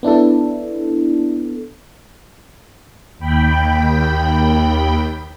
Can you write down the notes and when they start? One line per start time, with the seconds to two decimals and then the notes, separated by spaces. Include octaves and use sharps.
0.03 B3 D4 E4 A4
3.19 D#2 G5 B5